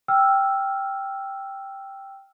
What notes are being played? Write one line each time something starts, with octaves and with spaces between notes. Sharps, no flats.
G5 E6 F6